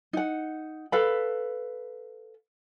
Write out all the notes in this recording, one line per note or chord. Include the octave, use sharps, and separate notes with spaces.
D#4 F#5
A4 B4 F5 B5